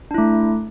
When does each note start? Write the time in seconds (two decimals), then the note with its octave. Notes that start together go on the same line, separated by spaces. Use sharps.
0.11 D4
0.14 E4
0.18 A3